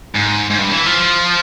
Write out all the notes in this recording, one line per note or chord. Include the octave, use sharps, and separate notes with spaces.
G#2
G#2
G2
E3
F3